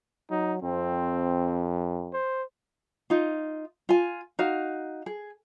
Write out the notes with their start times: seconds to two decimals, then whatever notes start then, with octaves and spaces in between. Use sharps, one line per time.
0.30 F#3 D#4
0.62 F2 C4
2.13 C5
3.10 D#4 F4
3.89 F4 G#5
4.39 D#4 F#4 F5
5.06 G#4